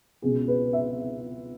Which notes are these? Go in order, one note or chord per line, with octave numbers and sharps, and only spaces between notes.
C#2 B2 B3 G#4
B4
E5